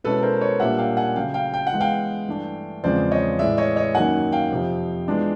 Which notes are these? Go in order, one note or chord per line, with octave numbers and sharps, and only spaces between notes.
B2 G#3 C#4 E4 A4 B4
A#4 C5
B4 C#5
A#2 G3 A#3 D4 E5 F#5
F5 G5
F#5 G#5
C#3 F#3 A3 F5 G5
F5 G5
G5
F#5
E3 G#3 B3
F5 G5
G2 E3 A3 D4
E2 C#3 F3 G#3 C4 C5 D5
C#5 D#5
A2 E3 G#3 D5 E5
C#5 D#5
C#5 D#5
F#2 D#3 F#3 A#3 D#4 F#5 G#5
F5 G5
F2 C3 F3
E3 G#3 B3 D4 F4